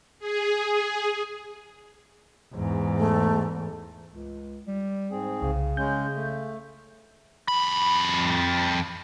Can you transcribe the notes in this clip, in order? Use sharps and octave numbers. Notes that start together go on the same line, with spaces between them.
G#4
E2 G#2
A3
C#2
G3
G#2 C4 G#4
C2 C#3
G#3 C#4 G6
A3
F2 B5